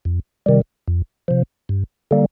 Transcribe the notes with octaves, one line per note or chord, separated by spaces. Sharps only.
F2
C3 D#3 G3
F2
C3 F3
G2
D3 G3 A#3